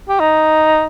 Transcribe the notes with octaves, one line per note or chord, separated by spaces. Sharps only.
G4
D#4